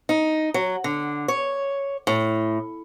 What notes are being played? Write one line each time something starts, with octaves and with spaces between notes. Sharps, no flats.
D#4
F#3
D3
C#5
A2